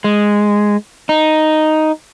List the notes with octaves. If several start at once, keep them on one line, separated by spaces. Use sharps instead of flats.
G#3
D#4